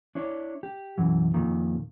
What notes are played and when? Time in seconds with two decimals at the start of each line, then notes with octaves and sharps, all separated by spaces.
0.15 D4 E4 C#5
0.63 G4
0.98 B1 F#2 E3 F#3
1.34 F2 A#2 D#3 F3